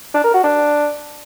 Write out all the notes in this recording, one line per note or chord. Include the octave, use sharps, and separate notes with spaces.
D4
A#4
F#4
D4